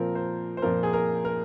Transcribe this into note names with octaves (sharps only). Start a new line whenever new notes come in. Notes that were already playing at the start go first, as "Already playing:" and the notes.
Already playing: A#2 F3 C4 A#4
C5
C5
A#2 F3 C4 A#4
G#4
A#4
A#4